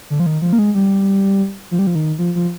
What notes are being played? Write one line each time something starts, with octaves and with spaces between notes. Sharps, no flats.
D3
F3
D#3
F3
A#3
G#3
G3
F3
G3
F3
D#3
F3
F3